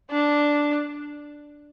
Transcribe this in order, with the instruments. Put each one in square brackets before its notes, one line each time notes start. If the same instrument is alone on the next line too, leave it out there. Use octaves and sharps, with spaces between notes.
[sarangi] D4